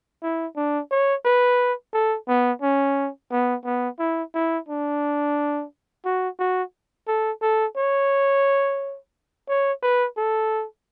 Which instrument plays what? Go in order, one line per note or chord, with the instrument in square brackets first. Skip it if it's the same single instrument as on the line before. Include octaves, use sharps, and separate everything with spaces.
[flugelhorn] E4
D4
C#5
B4
A4
B3
C#4
B3
B3
E4
E4
D4
F#4
F#4
A4
A4
C#5
C#5
B4
A4